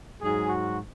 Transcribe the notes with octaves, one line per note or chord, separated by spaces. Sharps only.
G#2 F#3 G#4
F#4